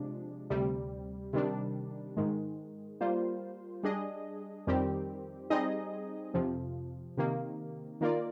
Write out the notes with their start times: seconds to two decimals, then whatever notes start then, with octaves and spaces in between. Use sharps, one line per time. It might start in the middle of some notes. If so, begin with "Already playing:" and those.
Already playing: C3 F3 G#3 D4
0.50 D2 C3 G3
1.33 C3 D#3 G3 D4
2.17 G#2 D#3 G#3
3.01 G3 A#3 F4 C5
3.83 G3 D4 G#4 D#5
4.67 F2 D#3 G3 C4 G4
5.50 G3 C4 D#4 G#4 D#5
6.34 F2 C3 F3
7.17 C3 D#3 A#3
8.01 D#3 A#3 F4 A#4 D5